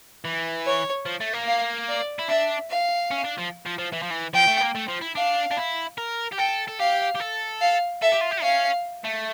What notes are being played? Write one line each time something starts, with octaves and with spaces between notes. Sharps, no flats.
E3
C#5
F3
A3
A#3
F5
D5
E4
D4 E5
F5
C#4
D4
F3
F3
F3
E3
F3
E3
F3 G5
A3
A#3
A3
F3
E4
D4 F5
D4
E4
A#4
G4
A4 G5
A4
G4 F5
G4
A4
F5
A4 E5
G4
F4
G4
C#4 F5
A3